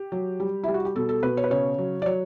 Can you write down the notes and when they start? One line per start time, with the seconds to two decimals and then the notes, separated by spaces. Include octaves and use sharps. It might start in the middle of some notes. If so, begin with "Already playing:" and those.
Already playing: G4
0.12 F#3
0.40 G3
0.63 G3 E4
0.74 F#4
0.85 G4
0.96 B2 A4
1.09 A4
1.23 B2 B4
1.37 C#5
1.44 B4
1.50 C#3 C#5
1.78 F#3
2.02 D5
2.06 F#3 C#5